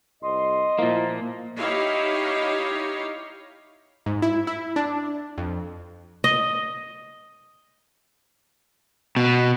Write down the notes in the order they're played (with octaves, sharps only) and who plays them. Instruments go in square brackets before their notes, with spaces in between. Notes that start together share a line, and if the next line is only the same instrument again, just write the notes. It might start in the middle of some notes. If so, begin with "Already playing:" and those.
[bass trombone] C2 [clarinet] D#5 [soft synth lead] C6
[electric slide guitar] A#2 A#3 [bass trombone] F3 [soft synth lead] E4
[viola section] D#4 E4 G4 C#5 D#5 F5
[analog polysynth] G#2
E4
E4
D4
F2
[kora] D#5
[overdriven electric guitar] B2